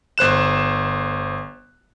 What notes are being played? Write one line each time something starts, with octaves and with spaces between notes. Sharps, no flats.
G1 C5 F#6 E7